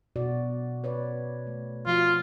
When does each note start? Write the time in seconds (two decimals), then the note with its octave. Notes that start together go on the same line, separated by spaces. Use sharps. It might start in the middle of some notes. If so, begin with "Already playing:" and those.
0.16 B2 F#4 D5
0.84 B4 C#5 D5
1.47 A3
1.87 F3 F4 F#4